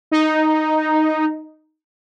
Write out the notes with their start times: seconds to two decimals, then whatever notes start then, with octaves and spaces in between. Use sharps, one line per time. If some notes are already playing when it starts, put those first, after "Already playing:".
0.11 D#4